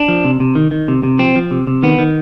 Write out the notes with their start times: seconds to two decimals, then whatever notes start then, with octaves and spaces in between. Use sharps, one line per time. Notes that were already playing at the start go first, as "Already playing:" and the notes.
Already playing: D4
0.08 F3
0.25 C3
0.40 C3
0.55 D#3
0.71 D#3
0.88 C3
1.03 C3
1.19 F3 C4
1.36 F3
1.51 C3
1.67 C3
1.83 D#3 B3
1.99 D#3